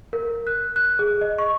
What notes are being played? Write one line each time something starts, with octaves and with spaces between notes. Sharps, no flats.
A#4
F#6
F#6
G#4
D#5
C#6